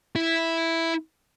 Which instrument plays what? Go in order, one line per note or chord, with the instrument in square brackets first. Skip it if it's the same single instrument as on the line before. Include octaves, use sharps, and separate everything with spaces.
[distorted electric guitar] E4